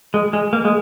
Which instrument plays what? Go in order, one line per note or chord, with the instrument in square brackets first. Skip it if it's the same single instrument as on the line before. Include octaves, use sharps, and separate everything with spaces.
[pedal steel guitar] G#3
G#3
A#3
G#3